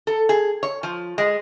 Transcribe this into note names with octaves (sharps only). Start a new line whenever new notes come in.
A4
G#4
C#5
F3
G#3